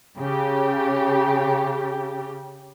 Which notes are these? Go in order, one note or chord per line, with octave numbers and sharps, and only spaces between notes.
C#3 G4